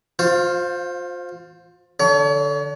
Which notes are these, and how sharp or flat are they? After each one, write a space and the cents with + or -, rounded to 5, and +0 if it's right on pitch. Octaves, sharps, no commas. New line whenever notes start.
F4 +30 C5 +0 F5 +0
D3 +0 C#5 +40